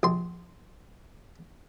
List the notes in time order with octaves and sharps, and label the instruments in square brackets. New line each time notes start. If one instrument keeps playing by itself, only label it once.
[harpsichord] A#1 C6